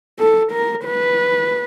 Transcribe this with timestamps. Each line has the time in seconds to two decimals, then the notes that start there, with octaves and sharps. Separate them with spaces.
0.19 A4
0.52 A#4
0.86 B4